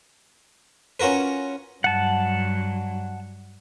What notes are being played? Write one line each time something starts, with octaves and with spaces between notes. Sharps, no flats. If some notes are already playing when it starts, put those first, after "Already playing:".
C#4 F4 F#4 A#4 B4
G2 F#3 F#5 A5